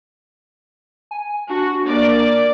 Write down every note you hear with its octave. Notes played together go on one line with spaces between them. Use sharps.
G#5
D4 F#4
A#3 D5